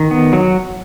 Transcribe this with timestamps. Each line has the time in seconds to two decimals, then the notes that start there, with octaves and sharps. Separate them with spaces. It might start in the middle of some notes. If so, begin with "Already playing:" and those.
Already playing: D#3
0.11 B3
0.33 F#3